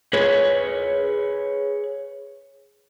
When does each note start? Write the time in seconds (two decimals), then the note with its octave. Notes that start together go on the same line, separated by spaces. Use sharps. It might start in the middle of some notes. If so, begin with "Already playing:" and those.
0.13 G#4 B4 C#5